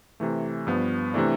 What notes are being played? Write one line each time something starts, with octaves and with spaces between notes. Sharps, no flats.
C3 E3 A3
G2 F3 B3
C3 E3 A3 D4